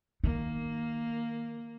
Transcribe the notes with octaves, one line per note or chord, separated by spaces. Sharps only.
D#3 A#3